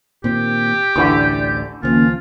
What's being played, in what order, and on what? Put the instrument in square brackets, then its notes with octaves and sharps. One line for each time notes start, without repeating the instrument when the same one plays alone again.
[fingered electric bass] A#2 D#3 C4 [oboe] G4
[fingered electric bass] A1 D2 [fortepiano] D3 E3 C#6 [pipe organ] D5 G6
[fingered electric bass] C#2 F3 [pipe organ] D#3 A#3 C#4 [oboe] F4